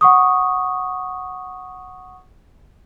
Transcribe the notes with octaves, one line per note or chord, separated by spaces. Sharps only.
F#5 C#6 D#6